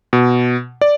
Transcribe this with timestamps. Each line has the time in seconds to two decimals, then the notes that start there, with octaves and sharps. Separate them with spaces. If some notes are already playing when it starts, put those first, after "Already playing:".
0.13 B2
0.81 D5